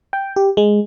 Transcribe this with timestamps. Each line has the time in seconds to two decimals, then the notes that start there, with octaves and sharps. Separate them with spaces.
0.13 G5
0.36 G4
0.57 G#3